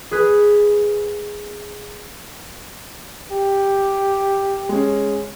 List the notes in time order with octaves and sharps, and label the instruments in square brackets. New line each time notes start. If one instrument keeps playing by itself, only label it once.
[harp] G#4 B4
[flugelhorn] G4
[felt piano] G#3 C#4